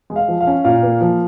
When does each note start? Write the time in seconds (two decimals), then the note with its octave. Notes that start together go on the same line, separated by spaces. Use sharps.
0.10 G#3
0.16 F5
0.28 F3
0.40 F5
0.47 C#4
0.64 A#2 F5
0.83 A#3
1.01 F3